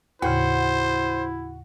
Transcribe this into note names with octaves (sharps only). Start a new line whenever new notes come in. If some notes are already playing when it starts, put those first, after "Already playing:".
D#2 A2 C#3 E4 F#4 C5